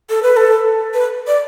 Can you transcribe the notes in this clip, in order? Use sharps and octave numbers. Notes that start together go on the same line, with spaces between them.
A4
B4
A4
B4
D5